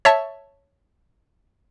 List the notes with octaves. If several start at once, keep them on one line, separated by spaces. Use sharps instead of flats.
C#5 E5 A5